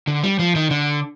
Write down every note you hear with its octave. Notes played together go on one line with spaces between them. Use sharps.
D3
G3
F3
D#3
D3